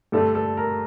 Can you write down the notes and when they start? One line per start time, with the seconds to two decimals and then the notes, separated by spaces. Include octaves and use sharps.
0.12 G2 D3 A3 A4
0.35 A4
0.57 A#4